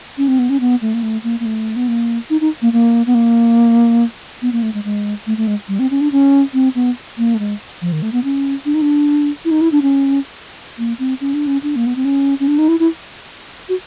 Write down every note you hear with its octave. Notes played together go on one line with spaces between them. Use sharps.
C#4
C4
B3
C#4
B3
A3
A#3
A3
A#3
A#3
A3
B3
A#3
D#4
D#4
A#3
A#3
B3
A#3
B3
A#3
A3
G#3
G#3
A3
A3
G#3
G3
C4
C#4
D4
C#4
C4
B3
A#3
A3
G#3
F3
D#3
A3
B3
C#4
D4
D#4
D4
E4
D#4
E4
D4
C#4
A#3
C4
C#4
D4
C#4
D4
A#3
B3
C4
C#4
C#4
D4
D#4
E4
E4
F#4